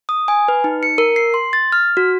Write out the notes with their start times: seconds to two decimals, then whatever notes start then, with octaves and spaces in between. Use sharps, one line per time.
0.09 D#6
0.28 G#5
0.48 B4
0.64 D#4
0.83 C#7
0.98 A#4
1.16 C7
1.34 C6
1.53 A6
1.72 F6
1.97 F#4